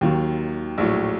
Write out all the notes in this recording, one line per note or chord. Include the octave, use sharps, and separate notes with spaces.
D#2 D#3 F#3
A#1 A2 F#3